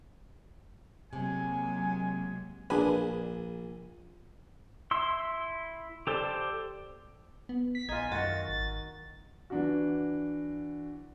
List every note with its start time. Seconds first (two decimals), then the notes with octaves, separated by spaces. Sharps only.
1.13 C3 F#3 G#3 A#3 G#5
2.70 A#1 D4 G#4 B4 G#5
4.91 E4 C6 E6
6.07 G4 A4 C5 D5 G5
7.49 B3
7.75 B6
7.89 A#1 D#4 F4 G#5
8.12 F#2 D#3 F#4 A6
8.49 G#1
9.50 E3 D4 F#4